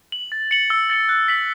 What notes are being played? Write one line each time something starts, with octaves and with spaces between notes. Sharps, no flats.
F#7
A6
C#7 F#7
E6
A6 C#7 F#7
F#6
B6 F#7